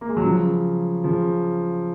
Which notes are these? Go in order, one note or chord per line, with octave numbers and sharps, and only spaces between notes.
A#3
G#3
F#3
C#3 F3
C#3 F3